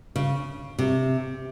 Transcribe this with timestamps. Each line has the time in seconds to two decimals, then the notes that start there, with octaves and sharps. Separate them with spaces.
0.16 C#3
0.78 C3